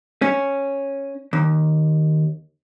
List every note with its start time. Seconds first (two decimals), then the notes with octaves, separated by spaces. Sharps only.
0.22 C#4
1.33 D#2